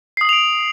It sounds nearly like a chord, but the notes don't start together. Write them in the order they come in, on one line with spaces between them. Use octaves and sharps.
C7 D#6 F#7 F7 D7